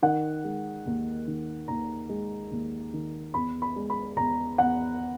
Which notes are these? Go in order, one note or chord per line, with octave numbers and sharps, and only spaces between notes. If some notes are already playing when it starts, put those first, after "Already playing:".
D#3 F#5
G#3
D#2
D#3
D#2 A#5
G#3
D#2
D#3
E2 B5
B5
G#3
B5
E2 A#5
E2 F#5